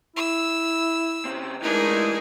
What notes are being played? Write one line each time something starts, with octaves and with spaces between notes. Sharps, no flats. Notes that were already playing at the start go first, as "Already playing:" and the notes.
E4 E6
C#3 C4
E3 G#3 A3 D4 D#4 G#4 A#4